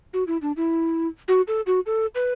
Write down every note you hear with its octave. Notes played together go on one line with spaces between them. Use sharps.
F#4
E4
D4
E4
F#4
A4
F#4
A4
B4